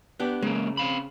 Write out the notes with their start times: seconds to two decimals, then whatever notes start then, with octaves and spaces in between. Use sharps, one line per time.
0.20 B3 D4 G4
0.42 C#3 G#3 A#3
0.77 C4 F5 B5